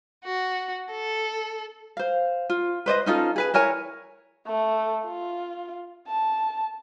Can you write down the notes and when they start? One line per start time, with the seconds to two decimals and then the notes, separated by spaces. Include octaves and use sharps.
0.25 F#4
0.91 A4
1.97 C5 F5
2.50 F4
2.86 B4 C5 D5 D#5
3.06 C#4 D#4 F4 A4
3.36 G#4 B4 G#5
3.54 E4 A#4 C#5 G#5
4.47 A3
5.05 F4
6.07 A5